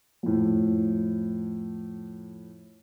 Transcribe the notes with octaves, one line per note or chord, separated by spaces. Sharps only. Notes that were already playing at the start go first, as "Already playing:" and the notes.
F2 A2